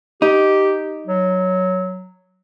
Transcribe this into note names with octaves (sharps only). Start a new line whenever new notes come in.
D#4 G4
F#3